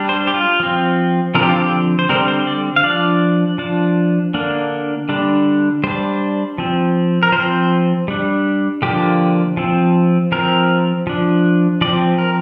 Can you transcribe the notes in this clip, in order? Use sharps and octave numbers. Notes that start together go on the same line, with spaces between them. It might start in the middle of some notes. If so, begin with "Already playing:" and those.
Already playing: G3 D4
C5
G4
F4
F3 C4
D3 F3 C4 A#4
G4
F4
G4
C5
D3 G3 C4 A#4
C5
D5
F5
F3 D4 D5
F3 D4
D3 A#3 D4
D3 G3 D4
G3 D4 C5
F3 C4
A#4
F3 C4 C5
G3 D4
D3 F3 A#3 D4 G4
F3 C4
F3 C4 A#4
F3 D4
F3 C4 D5
A#4